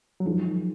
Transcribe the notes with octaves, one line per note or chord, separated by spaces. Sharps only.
F#3
F#2 D#3 F3 G#3